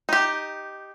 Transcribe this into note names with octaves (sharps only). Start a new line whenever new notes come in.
D#4 G4